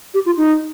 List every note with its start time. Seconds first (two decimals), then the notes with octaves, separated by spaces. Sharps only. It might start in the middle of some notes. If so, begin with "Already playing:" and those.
0.14 G4
0.26 F4
0.37 D#4